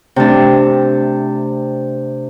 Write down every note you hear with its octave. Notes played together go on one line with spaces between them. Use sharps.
C3 A3 D4